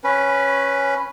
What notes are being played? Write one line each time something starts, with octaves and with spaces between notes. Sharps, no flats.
C#4 B4